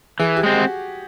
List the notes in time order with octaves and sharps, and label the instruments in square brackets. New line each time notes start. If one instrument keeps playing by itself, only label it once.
[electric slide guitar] E3 [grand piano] G#4
[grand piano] G4
[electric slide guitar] G#3 C4
[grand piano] F#4